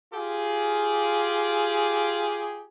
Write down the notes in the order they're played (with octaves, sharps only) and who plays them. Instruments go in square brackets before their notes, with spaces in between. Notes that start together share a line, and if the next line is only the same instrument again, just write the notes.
[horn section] F4 G4 G#4